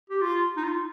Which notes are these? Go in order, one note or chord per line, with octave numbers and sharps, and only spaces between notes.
G4
F4
D#4
F4